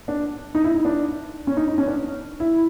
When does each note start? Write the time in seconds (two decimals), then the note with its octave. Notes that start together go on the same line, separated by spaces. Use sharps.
0.08 D4
0.55 D#4
0.64 E4
0.74 D#4
0.85 D4
1.47 C#4
1.57 D#4
1.68 D#4
1.78 C#4
1.88 D4
2.40 E4